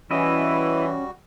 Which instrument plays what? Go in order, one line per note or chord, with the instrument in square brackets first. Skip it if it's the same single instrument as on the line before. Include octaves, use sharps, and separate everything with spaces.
[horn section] E3 [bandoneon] G3 F#4 [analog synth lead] C#4 [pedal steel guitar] E4 D#5